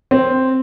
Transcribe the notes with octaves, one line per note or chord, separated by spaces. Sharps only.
C4